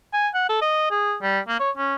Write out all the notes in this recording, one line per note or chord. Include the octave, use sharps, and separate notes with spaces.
G#5
F#5
A4
D#5
G#4
G3
A#3
C#5
C#4